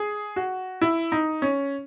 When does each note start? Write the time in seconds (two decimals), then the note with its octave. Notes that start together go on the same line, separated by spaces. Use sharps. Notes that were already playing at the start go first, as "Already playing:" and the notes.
Already playing: G#4
0.36 F#4
0.81 E4
1.12 D#4
1.42 C#4